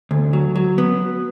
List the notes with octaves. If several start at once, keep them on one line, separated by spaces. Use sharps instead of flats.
D2
F#3
F#3
B3